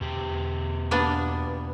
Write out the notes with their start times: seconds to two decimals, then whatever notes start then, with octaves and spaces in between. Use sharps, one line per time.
0.01 E2 B2 G4
0.91 A#3 B3 D4